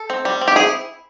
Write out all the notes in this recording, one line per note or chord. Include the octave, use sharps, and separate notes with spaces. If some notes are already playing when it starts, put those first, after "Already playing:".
Already playing: A4
C4
G3
C4
G4
E4 G#4